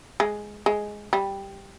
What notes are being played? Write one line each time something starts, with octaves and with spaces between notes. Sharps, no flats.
G#3
G#3
G3